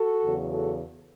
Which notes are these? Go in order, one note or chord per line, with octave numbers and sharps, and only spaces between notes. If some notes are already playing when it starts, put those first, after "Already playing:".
Already playing: F#4 A4
E2 C#3 F#3
F#4 A4